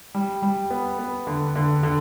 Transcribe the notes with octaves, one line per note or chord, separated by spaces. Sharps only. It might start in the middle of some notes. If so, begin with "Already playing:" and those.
G3
G3
B3
B3
D3
D3
D3